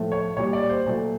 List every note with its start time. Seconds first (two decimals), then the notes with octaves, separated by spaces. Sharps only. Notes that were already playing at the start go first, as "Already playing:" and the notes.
Already playing: A2 F3 A3
0.12 C#5
0.37 A#2 G3 C#5
0.53 D5
0.69 C5
0.86 A#2 F#3 A3